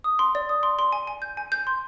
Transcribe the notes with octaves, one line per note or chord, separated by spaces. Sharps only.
D#6
C6
D5
D#6
C6
C6
G#5
G#5
G6
G#5
G6
C6